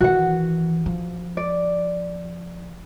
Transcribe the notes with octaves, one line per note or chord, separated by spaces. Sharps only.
D#3 E3 F#4 F#5
F3
D5